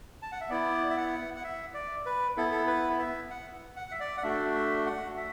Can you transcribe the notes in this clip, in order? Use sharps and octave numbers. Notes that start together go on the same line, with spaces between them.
A5
F#5
E5
B3 E4 D5
E5
F#5
F#5
E5
D5
B4
B3 E4 A4
A4
B4
E5
F#5
F#5
E5
D5
F#5
A3 D4 F#4 E5
E5
F#5
E5